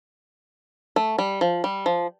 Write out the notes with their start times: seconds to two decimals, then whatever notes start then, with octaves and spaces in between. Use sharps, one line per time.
0.96 A3
1.19 G3
1.41 F3
1.64 G3
1.86 F3